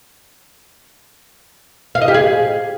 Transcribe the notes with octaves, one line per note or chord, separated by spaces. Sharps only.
F5
D#5
G4
G#4